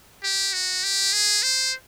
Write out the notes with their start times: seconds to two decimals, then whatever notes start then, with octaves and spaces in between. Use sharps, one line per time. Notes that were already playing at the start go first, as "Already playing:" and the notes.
0.23 G4
0.53 F#4
0.84 G4
1.13 G#4
1.43 C5